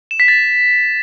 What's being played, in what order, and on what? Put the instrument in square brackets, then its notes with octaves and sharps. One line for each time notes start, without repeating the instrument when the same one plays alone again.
[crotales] E7
B6
A6